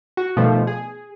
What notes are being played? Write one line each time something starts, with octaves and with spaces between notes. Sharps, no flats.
F#4
B2 D#3 F3 G3 A3
G#4